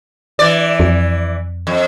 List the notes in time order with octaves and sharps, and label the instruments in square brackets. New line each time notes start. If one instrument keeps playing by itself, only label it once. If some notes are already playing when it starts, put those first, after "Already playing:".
[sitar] E3 D5
[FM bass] F2
[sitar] F2